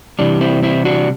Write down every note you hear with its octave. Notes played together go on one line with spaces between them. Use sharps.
C3 E3 G3 D4
C4 E4
C4 E4
D4 F#4